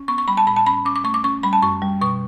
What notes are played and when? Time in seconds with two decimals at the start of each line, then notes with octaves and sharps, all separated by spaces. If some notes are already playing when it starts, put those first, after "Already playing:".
Already playing: C#4
0.08 B3 C#6
0.18 C#6
0.28 G3 B5
0.37 A5
0.47 A2 B5
0.56 A5
0.66 C#4 B5
0.85 C#4 D6
0.96 D6
1.04 A3 C#6
1.14 D6
1.24 C#4 C#6
1.43 G3 B5
1.53 A5
1.63 F#2 C#6
1.82 G3
2.01 B2 C#6